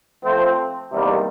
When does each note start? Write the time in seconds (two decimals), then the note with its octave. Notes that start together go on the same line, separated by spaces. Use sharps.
0.22 F3 A3 C4
0.90 E2 C3 D#3 G3 A#3